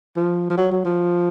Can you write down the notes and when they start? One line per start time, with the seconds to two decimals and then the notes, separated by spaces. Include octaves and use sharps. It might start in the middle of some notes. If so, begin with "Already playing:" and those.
0.17 F3
0.50 F3
0.57 F#3
0.72 F#3
0.85 F3